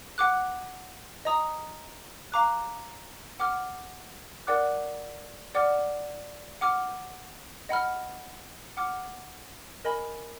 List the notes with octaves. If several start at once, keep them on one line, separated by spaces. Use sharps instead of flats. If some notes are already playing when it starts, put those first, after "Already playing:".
F#5 D6 F#6
D#5 A#5 D#6
F5 A#5 D6 F#6
F#5 D6 F6
A#4 D5 F#5 D6 F#6
D5 F#5 D6 F6
F#5 D6 F6
D#5 F#5 B5 F6
F#5 D6 F6
A#4 D#5 G#5 B5